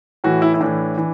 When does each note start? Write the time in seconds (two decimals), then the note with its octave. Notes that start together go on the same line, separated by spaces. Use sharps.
0.24 A2 E3 F#4
0.42 E4
0.54 E4
0.60 A2 E3 D4
0.98 E3